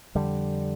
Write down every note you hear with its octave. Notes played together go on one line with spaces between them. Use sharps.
F2 D3 G3